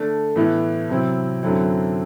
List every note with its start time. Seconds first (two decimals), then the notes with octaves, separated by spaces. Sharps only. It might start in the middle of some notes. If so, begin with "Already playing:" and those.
Already playing: D3 A3 D4
0.36 A2 E3 B3 E4
0.89 C3 F#3 C4 E4
1.43 F#2 D3 F#3 C4 E4